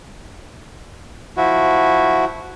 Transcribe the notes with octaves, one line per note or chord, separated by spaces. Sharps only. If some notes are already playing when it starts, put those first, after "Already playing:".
F3 E4 F#4